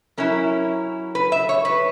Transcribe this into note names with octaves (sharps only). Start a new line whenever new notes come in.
F#3 C#4 E4 A#4
B4
E5
C#5
B4